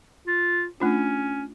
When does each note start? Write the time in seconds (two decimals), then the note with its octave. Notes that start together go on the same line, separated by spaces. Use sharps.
0.27 F4
0.80 A3 C#4 D4 F4